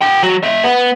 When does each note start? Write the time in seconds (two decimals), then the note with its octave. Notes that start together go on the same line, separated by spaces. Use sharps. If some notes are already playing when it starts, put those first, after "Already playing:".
0.01 F#4 G5
0.23 F#3 F#4
0.43 A#3 E5
0.64 B3